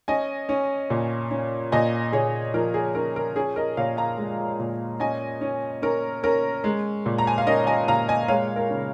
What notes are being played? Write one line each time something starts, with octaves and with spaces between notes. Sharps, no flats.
C#4 D#5 G#5
C#4
A#2
C#4
A#2 D#5 G#5
A#2 G#4 C#5
F3 A#4
G#4
C#4 A#4
A#4
C#4 G#4
A#4 D#5
A#2 C#5 F5
F5 A#5
G#3
A#2
C#4 D#5 G#5
C#4
C#4 A#4
C#4 A#4
G#3
A#2
A#5
G#5
F5
C#4 A#4 D#5
D#5 G#5
A#2 F5 A#5
D#5 G#5
G#3 C#5 F5
A#4
C#3